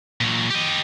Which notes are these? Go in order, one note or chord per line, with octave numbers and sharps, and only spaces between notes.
A#2 F#3
G4 D#5